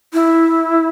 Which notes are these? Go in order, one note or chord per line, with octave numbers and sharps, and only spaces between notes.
E4